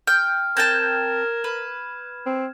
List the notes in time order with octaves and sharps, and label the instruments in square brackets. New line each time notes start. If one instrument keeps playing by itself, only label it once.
[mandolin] G5 [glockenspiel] F6
[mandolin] C4 G5 A5 [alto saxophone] A#4 [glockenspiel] G#6 E7
[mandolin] B4
[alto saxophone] C4